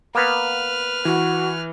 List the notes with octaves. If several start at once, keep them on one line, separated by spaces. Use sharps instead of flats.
A#3 B3 B4 F6
E3 F#4